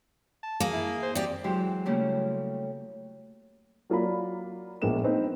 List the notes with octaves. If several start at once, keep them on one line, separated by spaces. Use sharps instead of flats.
A5
A#3 G#4
E4
C5
C4 G4 D5
E3 F#3 G#3 E4 G4 C5
C#3 G3 A3 A#3 C#4 E4
F#3 A#3 F4 D5 A#5 B5
A#1 G#3 A#3 B3 E7
A#3 C4 D#4 B4